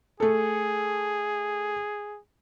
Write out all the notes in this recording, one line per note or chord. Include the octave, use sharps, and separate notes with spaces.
A3 G#4 A4